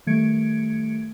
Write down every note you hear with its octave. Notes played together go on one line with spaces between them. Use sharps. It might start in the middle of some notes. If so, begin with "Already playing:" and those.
D#3 G3 A3 G#6 C#7 D7